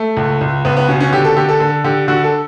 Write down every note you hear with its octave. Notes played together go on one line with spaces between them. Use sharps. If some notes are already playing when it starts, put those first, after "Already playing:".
Already playing: A3
C#2
C#2
C#2 B3
B3
B2 C#4
C#4
D3 G4
A4
D3 G4
A4
D3 A4
D3 G4
D3 F#4
A4